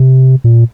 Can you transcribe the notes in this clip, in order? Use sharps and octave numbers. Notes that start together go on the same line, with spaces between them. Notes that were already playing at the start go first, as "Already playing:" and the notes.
Already playing: C3
A#2